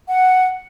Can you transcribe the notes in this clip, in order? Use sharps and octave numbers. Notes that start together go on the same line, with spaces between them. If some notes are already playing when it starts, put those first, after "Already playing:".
F#5